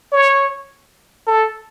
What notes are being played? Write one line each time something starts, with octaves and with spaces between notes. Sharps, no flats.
C#5
A4